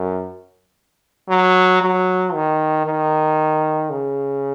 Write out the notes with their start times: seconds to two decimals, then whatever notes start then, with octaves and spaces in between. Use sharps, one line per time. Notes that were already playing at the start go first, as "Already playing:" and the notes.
Already playing: F#2
1.29 F#3
1.81 F#3
2.34 D#3
2.86 D#3
3.90 C#3